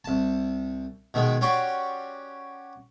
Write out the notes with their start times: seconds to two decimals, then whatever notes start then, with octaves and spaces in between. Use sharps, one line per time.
0.04 C2 A5
1.14 B2 D#3 G#3
1.41 C#4 F#4 G4 D5 C6